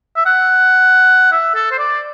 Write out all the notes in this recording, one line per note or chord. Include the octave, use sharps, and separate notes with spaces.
E5
F#5
E5
A4
C5
D5